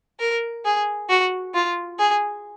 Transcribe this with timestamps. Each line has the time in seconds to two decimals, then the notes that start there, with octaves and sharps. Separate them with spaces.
0.20 A#4
0.65 G#4
1.09 F#4
1.54 F4
1.99 G#4